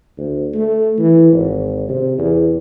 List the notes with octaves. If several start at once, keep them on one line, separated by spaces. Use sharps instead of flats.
D2
A3
E3
G#1
C3
E2